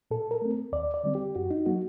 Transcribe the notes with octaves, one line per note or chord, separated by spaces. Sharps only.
A#2 A4
A#4
A3 C4
D#2 D5
D5
D3 G3 C4
G4
F#2 F#4
D#4
F#3 A#3 F#4